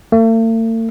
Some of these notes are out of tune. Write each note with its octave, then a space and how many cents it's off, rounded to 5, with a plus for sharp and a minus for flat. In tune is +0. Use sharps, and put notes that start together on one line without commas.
A3 +45